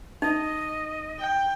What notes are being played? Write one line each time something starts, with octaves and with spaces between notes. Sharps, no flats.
D#4 D#5
G5